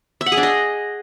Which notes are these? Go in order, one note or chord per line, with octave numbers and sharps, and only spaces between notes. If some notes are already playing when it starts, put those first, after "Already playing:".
E5
F#5
G#4
D4
D#5